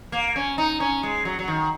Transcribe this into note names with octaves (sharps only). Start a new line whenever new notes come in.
A#3
C#4
D#4
C#4
G#3
F#3
F#3
D#3